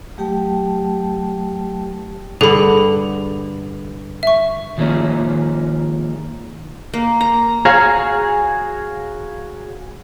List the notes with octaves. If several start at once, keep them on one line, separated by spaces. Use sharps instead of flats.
F#3 A3 G4 G5 A5
G2 D3 G#4 B5
E5 C#6
D#3 F3 G#3 A#3 C#4
A#3
A#5
F#4 G#4 C#5 F5 A#5